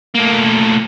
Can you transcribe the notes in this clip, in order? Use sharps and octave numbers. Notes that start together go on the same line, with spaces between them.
A2 A#3